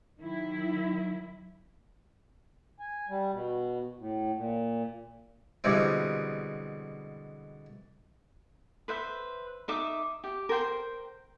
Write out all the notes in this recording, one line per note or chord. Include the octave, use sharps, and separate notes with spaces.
D#3 F#3 E4
G#5
G3
B2
A2
A#2
B2 D3 E3 G3 G#3 C4
B4 C5 E5
D#4 E5 D6
G4
A#4 C5 G5 C6